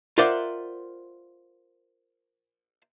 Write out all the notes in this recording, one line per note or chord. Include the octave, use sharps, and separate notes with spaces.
F4 A#4 C5 D5 E5 F#5